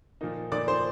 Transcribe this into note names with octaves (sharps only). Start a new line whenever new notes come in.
A#2 F3 A#3 D#4
A#2 F3 A#3 D#4 D5 D6
C5 C6